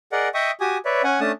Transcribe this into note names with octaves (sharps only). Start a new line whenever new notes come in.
G#4 A#4 D5 D#5 F#5
D#5 E5 G5 C#6 D#6
F#4 G4 G#5 D#6
B4 C#5 D5 E5
C#4 F#5 G#5
A3 C#4 D4 A5 D#6